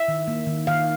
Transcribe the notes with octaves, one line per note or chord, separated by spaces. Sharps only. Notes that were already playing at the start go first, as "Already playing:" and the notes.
Already playing: E5
D#3
A#3
D#3
D#3 F5